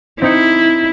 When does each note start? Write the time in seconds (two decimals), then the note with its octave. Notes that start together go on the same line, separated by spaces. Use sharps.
0.22 C4 D#4 E4 C#7